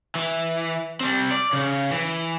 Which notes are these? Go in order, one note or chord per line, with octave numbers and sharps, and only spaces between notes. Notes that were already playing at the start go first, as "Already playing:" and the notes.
E3
G3 C4
D5
C#3
E3